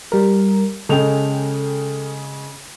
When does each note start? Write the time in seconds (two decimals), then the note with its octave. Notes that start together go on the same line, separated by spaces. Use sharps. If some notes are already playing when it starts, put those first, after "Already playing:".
0.12 G3 A#4
0.89 C#3 G#3 A4 G5 F7